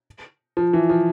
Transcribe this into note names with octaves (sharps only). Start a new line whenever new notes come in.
F3
E3
F3